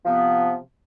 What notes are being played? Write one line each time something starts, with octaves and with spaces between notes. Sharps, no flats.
C3 F3 B3